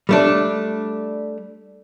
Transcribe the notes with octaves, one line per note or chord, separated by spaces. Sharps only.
G3 A3 D4